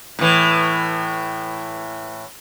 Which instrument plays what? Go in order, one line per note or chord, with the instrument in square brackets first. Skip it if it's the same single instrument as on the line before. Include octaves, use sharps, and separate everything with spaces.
[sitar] A2 E3